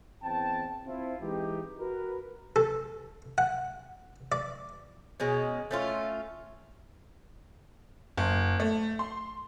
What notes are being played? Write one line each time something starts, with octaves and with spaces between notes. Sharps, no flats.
E2 C4 G5 A5
C4 E4 F4
E3 G#3 D#4 E4 G4
F#4 A#4 B4
A4
F#5
D5
B2 G#3 C#4
A3 C#4 F4
F#1
A3
C6